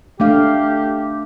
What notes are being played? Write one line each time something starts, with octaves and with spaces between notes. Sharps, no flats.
A3 D4 G4 F5